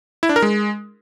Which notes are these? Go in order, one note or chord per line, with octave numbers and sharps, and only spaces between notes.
E4
D4
A#4
G#3